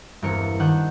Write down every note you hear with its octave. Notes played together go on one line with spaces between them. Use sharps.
E1 G2 E3 C4 A#4 C#7
D#3 D4 F#5 F#6 G6